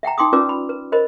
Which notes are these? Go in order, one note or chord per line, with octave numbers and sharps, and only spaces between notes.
E5 F#5 G5 A#5
D#4 G5 C6 D6 D#6
C#4 F4 B4 D5 D6 E6
B5
B4
A#4 C5 D#5 B5